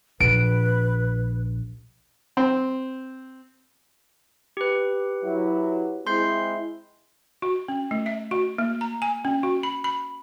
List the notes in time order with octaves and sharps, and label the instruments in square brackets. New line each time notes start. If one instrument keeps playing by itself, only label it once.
[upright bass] A#1 [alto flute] B4 [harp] D7
[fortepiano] C4
[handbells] G4 B4
[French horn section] F#3 E4
[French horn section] G#3 C4 E4 [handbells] C6 G6 C7
[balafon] F#4
C#4
A3
E5
F#4
A#3
A#5
G#5
C#4
F#4
B5
B5